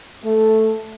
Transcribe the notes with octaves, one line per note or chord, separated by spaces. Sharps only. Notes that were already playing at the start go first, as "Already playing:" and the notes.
A3